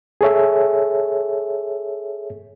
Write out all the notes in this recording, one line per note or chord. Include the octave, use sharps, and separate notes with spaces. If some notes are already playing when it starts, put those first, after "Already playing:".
G#4 A4 C#5 E5